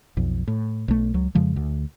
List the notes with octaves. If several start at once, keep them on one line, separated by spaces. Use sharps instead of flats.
B1 F2
A2
B1 A3
C#2 F#3
F2 C#3 F3 G#3
D2